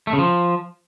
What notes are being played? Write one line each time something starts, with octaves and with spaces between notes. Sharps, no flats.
A3
C#3
F3